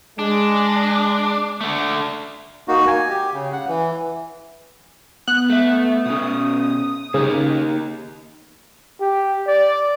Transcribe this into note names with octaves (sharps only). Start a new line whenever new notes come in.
G#3 D4
D3 A3
A#3 D#4 F#4
G#5
G4
C#3
F#5
E3
B3 F#6
A3 E5
B2 C#4 D#6
C#3 A#3 D#4 G4
G4
D5